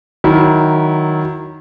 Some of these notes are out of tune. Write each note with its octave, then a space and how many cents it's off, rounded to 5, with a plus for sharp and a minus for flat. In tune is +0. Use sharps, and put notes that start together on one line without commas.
D#3 +0 F#3 +0 E4 -20